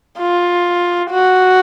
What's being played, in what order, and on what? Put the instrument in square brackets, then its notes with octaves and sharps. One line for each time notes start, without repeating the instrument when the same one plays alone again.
[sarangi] F4
F#4